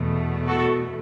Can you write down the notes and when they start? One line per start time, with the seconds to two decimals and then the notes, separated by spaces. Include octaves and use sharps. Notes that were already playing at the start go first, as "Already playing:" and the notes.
Already playing: E2 B2 A3
0.48 F#4 A4